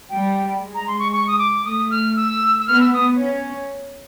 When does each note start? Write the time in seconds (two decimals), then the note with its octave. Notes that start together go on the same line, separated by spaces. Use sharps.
0.09 G3 G5
0.61 G#3
0.74 A#5
0.87 C6
0.99 C#6
1.12 C#6
1.28 D#6
1.39 D6
1.64 A3 D#6
1.91 F6
2.16 E6
2.59 E6
2.67 B3 F6
2.80 E6
2.94 D#6
3.20 C#4